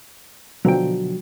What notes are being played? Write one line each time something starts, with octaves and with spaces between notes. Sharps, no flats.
B2 D3 F3 F#3 G5